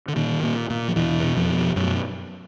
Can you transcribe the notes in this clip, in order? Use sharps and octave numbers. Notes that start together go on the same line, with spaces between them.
D3
A#2 D#3
A#2
A#2
F3
E2 B2 E3
B2
F2 F3
B2
F#2 B2 F#3